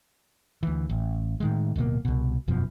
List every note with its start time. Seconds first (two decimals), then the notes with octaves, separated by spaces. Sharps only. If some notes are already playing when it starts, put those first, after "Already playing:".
0.63 D2 E3
0.89 A1
1.40 A2 D#3 G#3
1.76 D1 B2 G#3 A#3
2.05 C2 B2
2.48 E1 F#2 B2 F3